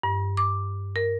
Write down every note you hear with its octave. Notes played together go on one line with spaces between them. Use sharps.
G2
D6
A#4